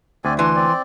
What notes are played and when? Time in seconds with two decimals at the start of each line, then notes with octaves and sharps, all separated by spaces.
0.25 D2 C4 D5 G#5
0.39 E3 D4 C6
0.56 C4 D5